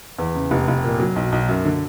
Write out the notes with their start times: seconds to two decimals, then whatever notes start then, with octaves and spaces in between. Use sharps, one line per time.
0.18 E2
0.35 C#3
0.51 F1
0.68 F1
0.84 A#2
1.00 F#3
1.16 B1
1.32 B1
1.49 F#2
1.65 D3